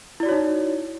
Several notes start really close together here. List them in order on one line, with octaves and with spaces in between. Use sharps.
E4 D5 F#4 C#5 D#4